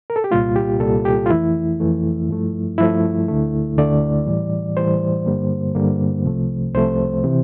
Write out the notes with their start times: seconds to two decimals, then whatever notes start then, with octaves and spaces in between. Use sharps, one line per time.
0.10 A#4
0.16 A4
0.24 G4
0.31 C2 A#2 G3 A#3 F4
0.56 G4
0.80 C2 A#2 G3 A#3 A4
1.05 G4
1.26 F4
1.30 F2 E3 A3 E4
1.80 F2 E3 A3
2.29 G2 F3 A3
2.78 G2 F3 A3 E4
3.28 D2 D3 A3
3.77 D2 D3 A3 D5
4.27 A2 E3 G3
4.77 A2 E3 G3 C5
5.26 G2 D3 G3 A#3
5.75 G2 D3 G3 A#3
6.25 C2 C3 F3 A3
6.75 C2 C3 F3 A3 C5
7.24 C3 E3